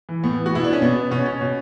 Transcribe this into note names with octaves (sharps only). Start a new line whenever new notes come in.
E3
A2 B3
E3
F#4
B2 E4
D4
C#4
B2 B3
B2 C#4
C#4
B2